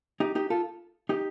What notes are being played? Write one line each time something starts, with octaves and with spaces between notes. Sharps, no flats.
D#4 G4
D#4 G4
F4 A4
D#4 G4